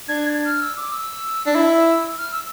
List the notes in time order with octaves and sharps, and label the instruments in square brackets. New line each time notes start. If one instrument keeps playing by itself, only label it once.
[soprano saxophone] D4 [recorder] G#6
[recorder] G#6
F6
E6
D6
E6
[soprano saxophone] D4
E4
[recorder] F6
E6